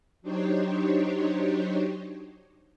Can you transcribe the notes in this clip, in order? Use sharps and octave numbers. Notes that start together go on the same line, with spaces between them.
F#3 D4 D#4 G4 C5 C#5